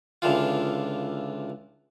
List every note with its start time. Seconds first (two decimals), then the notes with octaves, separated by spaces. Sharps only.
0.22 C#2 D3 E3 F4